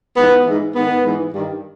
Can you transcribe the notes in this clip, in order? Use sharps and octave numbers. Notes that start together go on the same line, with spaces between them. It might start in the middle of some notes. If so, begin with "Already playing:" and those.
G#2 E3 B3
G#2 E3
G#2 D#3 B3
G#2 E3
G2 D#3